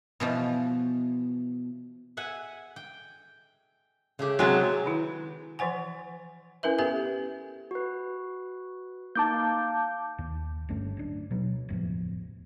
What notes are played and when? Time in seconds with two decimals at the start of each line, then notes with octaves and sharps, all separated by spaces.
0.20 B2 E3 F3
2.17 E5 F#5 G#5
2.76 G5
4.19 C#3 A3 G4
4.39 C3 F#3 G#3 C4
4.86 D#3 E4
5.59 E3 F3 C5 F#5 G#5
6.63 C#4 E4 A#4 B4 E5
6.78 B3 G4 A4 B4 E5 G#5
7.71 F#4 B4
9.15 A#3 D#4 A5 D6 G6
9.34 F5
10.18 D#2
10.69 G1 G2 A3 C#4
10.97 D1 D4
11.31 B2 F#3
11.69 F#1 E2 A2 F3